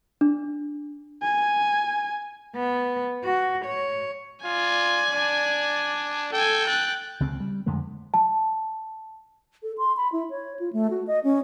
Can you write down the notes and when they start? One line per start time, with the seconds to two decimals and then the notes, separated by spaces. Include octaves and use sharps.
0.21 D4
1.22 G#5
2.56 B3
3.25 F#4
3.65 C#5
4.44 F4 D5 G#5
5.11 D4
6.33 A4 G5 G#5
6.67 F#6 A6
7.20 C#2 C#3 C4
7.40 G3
7.66 F2 D3 G#3 A3
8.14 A5
9.63 A4
9.78 C6
9.97 B5
10.12 E4
10.30 C#5
10.60 F4
10.73 A3
10.90 F#4
11.07 D#5
11.24 C#4